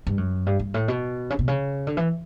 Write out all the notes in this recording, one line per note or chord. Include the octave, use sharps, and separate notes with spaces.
G2
F#2
G2
G2
A2
B2
C#3
B2
C#3
D3
E3